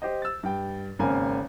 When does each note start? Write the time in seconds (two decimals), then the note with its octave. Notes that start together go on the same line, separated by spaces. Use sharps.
0.02 G4 C5 D#5
0.22 E6 A6
0.43 G2 G5
0.99 G#1 C#3 A#3 C4 G#5